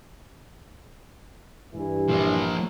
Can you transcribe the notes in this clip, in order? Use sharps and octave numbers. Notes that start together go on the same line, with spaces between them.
G2 E3
F3 A#3